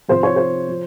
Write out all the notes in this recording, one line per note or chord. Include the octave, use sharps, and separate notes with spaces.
C3 F3 C5
C#5
C5
F3